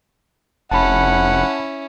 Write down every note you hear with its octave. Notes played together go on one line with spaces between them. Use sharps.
F1 C#4 E4 F#5 A5 B5